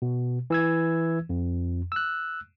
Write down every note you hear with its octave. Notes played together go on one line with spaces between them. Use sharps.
B2
E3 E6 G#6
F2
E6 F#6